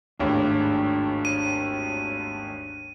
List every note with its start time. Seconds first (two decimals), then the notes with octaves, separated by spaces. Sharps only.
0.19 G#1 D#2 A2 D4 G#4 B4
1.25 D#7